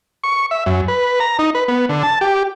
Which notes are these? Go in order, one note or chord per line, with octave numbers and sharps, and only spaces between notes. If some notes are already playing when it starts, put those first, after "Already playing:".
C#6
E5
F#2
B4
A#5
D#4
B4
B3
D3
A5
G4